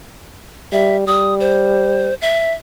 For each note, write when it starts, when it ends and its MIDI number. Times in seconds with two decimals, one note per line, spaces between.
0.72 1.05 55
0.72 0.97 76
1.07 2.09 55
1.07 1.34 87
1.40 2.14 72
2.22 2.53 76